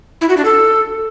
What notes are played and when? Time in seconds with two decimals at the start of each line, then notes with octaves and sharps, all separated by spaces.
0.21 E4
0.29 F#4
0.37 D4
0.45 A4